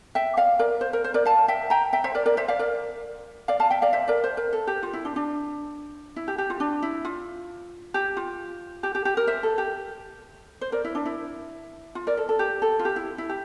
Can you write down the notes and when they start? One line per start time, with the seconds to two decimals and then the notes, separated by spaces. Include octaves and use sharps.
0.15 E5 G5
0.37 D5 F5
0.59 A#4 D5
0.81 C5
0.93 A#4
1.04 C5
1.14 A#4 D5
1.25 F5 A5
1.48 E5 G5
1.70 G5 A#5
1.93 E5 G5
2.04 C5 E5
2.15 A#4 D5
2.26 A#4 D5
2.37 C5 E5
2.48 D5 F5
2.59 A#4 D5
3.48 D5 F5
3.60 F5 A5
3.70 E5 G5
3.82 D5 F5
3.93 C5 E5
4.08 A#4 D5
4.24 C5
4.37 A#4
4.53 A4
4.67 G4
4.83 F4
4.93 E4
5.05 D4
5.16 D4
6.16 E4
6.28 G4
6.38 G4
6.50 F4
6.60 D4
6.82 E4
7.05 F4
7.94 G4
8.17 F4
8.83 G4
8.95 G4
9.05 G4
9.17 A#4
9.27 C5 E5
9.43 A4
9.58 G4
10.61 C5
10.72 A#4 D5
10.84 E4
10.95 D4
11.06 E4
11.95 F4
12.07 A#4 D5
12.17 A4
12.29 A4
12.39 G4
12.62 A4
12.79 F4
12.85 G4
12.96 E4
13.18 E4
13.29 G4